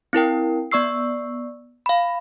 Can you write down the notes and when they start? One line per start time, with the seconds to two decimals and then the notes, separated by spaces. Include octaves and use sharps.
0.13 C4 E4 A#4 G5
0.72 B3 D5 C#6 E6 C7
1.86 F5 B5